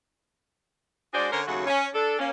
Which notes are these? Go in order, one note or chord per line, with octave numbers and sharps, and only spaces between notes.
G#3 D4 F#4 G#4 C5 D5
D3 C#4 A#4 C5 C#5
D#2 C#3 F#3 A3 F#4
C#4
D4 A4
A#3 C#4